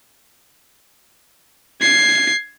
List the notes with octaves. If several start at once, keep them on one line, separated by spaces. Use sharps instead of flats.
G#6 C7